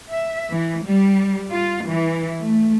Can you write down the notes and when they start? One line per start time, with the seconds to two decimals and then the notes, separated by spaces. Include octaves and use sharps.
0.12 E5
0.51 E3
0.86 G3
1.50 F4
1.87 E3
2.41 A3